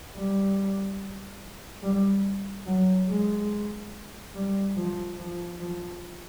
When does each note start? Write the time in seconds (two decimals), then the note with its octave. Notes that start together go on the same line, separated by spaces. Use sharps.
0.15 G3
1.83 G3
2.67 F#3
3.09 G#3
4.35 G3
4.77 F3
5.18 F3
5.61 F3